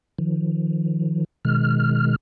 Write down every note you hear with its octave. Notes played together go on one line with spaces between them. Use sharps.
D#3 F3
B2 D#3 G#3 F6